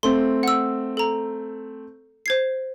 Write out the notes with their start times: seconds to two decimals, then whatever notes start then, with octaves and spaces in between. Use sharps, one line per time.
0.03 A3 C4 C6
0.43 F#5 E6
0.97 A4 A#5
2.26 C5 G#6 C7